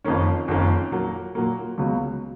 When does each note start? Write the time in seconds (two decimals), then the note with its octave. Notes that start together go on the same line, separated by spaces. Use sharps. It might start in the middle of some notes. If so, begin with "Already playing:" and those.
0.04 F#1 F2 D#3 A#3 C#4
0.48 F#1 F2 D#3 A#3 C#4
0.91 A#2 F#3 A#3
1.35 A#2 F#3 A#3
1.78 C#2 C#3 F#3 B3